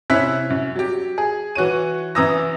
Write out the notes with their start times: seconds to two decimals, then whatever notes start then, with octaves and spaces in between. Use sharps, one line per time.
0.10 C3 C#4 E4 E5 F#6 B6
0.50 F#2
0.75 F#3 G4
1.18 G#4
1.55 E3 F#4 C#5 D#7
2.15 F#2 E3 A#5 D#6 E6 A#6